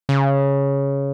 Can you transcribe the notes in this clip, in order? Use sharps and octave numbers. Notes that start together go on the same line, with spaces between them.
C#3